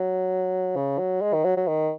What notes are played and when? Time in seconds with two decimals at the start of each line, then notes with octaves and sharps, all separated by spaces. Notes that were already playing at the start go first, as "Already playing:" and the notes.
Already playing: F#3
0.76 C#3
0.99 F#3
1.22 G#3
1.33 D#3
1.45 F#3
1.57 F#3
1.67 D#3